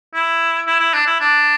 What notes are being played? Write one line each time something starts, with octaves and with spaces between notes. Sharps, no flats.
E4
E4
E4
D4
E4
D4